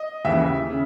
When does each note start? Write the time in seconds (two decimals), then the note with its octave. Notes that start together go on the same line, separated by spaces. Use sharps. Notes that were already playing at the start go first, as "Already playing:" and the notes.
Already playing: D#5
0.25 D#2 C#3 E3 E5
0.70 C#3